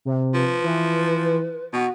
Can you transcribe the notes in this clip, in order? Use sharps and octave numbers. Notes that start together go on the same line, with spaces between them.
C3
F3 B4
E3
B2 F#4